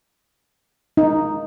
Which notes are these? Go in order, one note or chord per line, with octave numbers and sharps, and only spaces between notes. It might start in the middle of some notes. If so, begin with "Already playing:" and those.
D#4